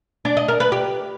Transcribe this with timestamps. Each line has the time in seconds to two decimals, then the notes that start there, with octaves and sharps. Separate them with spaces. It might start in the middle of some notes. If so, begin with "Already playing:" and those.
0.25 D4
0.37 D#5
0.48 A#4
0.60 B4
0.72 G4